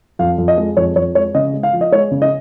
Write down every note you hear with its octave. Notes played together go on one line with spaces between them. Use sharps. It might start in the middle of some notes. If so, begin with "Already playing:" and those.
F2 F5
F2
D#5
G#3
F2 C#5
F2 C#5
G#3 C#5
C#3 D#5
G#3
F5
F3
D#5
G#3 C#5
C#3
D#5